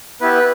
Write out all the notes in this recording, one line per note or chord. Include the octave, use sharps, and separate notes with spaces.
B3 E4 G4 B4